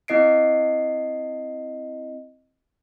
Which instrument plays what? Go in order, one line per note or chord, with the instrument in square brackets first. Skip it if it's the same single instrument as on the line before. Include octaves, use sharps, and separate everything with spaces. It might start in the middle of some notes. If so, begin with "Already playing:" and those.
[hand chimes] C4 E4 D#5 C7 D7